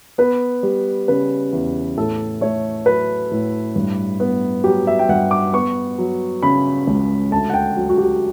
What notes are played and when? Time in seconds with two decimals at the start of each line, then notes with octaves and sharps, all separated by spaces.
0.18 B3 B4
0.63 G3
1.08 C#3 B4
1.52 E2
1.97 A2 A4
2.41 A3 C#5
2.86 F#3 B4
3.31 A2
3.76 G2
4.20 B3
4.64 F#3 G4
4.87 E5
4.99 G5
5.09 G2 F#5
5.31 D6
5.53 B3 C#6
5.98 F#3
6.43 C#3 B5
6.87 C#2
7.31 D2 A5
7.50 F#5
7.54 G5
7.77 F#3
7.89 F#4
7.98 G4